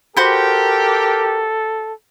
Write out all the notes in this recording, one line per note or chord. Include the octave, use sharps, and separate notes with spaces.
F#4 G4 A4 A#4 C5 B5